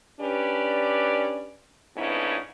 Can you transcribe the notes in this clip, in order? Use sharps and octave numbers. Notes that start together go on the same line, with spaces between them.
C#4 D4 G4 B4 D5
F2 G#2 B3 C#4 D4 E4